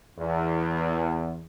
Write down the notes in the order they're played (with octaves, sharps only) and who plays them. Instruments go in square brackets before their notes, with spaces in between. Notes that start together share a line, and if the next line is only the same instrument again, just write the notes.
[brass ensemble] E2